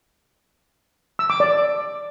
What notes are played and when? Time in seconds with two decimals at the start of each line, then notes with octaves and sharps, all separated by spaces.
1.19 E6
1.30 D6
1.40 D5